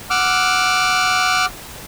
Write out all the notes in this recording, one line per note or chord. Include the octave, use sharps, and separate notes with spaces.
F#5 D6 E6 F6